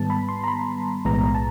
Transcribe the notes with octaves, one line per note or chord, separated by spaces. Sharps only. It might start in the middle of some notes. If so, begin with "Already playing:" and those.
Already playing: G#2 D#3 G3 B3 A5
B5
C6
A#5
B5
B1 A2 E3 G#3 B3 A#5
A5